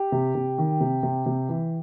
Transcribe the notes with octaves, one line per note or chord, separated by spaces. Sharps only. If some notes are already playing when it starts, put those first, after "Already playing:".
Already playing: G4
C3
C3
D#3
C3
C3
C3
E3